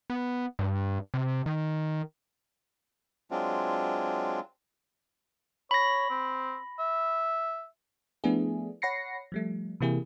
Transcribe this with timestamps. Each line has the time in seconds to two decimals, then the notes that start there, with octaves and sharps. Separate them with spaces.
0.10 B3
0.59 G2
1.14 C3
1.46 D#3
3.31 F#3 G#3 C4 D4 F4
5.71 C#5 B5 A#6
6.10 C4
6.79 E5
8.24 F3 A3 B3 D4 E4 G#4
8.82 C#5 F#5 B5 A#6 C7 C#7
9.32 F3 G3 A3
9.81 C3 E3 A#3 E4 G4 G#4